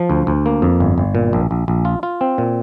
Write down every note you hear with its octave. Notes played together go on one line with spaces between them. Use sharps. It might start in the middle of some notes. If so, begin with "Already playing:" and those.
Already playing: F3
D2
D2
A#3
F2
G1
G1
A#2
A#1
A#1
A#1
F4
F4
C4
A#2